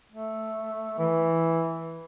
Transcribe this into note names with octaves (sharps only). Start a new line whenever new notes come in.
A3
E3